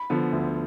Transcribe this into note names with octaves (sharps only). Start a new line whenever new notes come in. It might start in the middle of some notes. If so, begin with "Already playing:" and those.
Already playing: B5
D3 F3 B3
D2